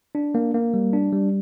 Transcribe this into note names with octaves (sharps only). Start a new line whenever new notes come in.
D4
A#3
A#3
G3
D4
G3